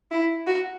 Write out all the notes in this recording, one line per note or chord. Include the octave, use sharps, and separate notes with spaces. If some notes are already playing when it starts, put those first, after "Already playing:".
E4
F#4